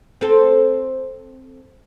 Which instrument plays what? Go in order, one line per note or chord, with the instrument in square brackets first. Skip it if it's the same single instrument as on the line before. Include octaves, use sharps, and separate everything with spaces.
[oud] C4 A4